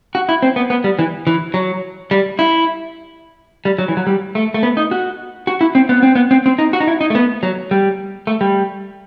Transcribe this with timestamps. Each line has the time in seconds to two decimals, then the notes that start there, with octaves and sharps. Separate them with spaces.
0.15 F#4
0.29 E4
0.43 C4
0.56 B3
0.70 B3
0.84 G3
0.99 E3
1.27 E3
1.54 F#3
2.11 G3
2.39 E4
3.65 G3
3.79 F#3
3.88 E3
3.97 F#3
4.07 G3
4.35 A3
4.54 A3
4.63 B3
4.77 D#4
4.91 F#4
5.47 F#4
5.61 E4
5.75 C4
5.89 B3
6.03 C4
6.15 B3
6.31 C4
6.46 C4
6.59 D#4
6.73 F#4
6.80 D#4
6.87 E4
7.01 D#4
7.10 A3
7.15 B3
7.43 F#3
7.71 G3
8.27 A3
8.41 G3